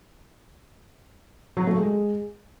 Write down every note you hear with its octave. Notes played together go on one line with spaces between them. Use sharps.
F#3
A3
G#3